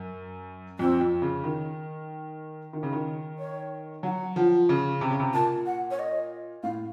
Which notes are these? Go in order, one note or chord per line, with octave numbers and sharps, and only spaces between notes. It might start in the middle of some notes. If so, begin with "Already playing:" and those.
Already playing: F#2
F2 C4
F2
C#3
D#3
D#3
C#3
D#3
C#5
F#3 F#5
F3
C#3
C3
C#3
C3
A#2 A5
F#5
C#5
D#5
A2 F5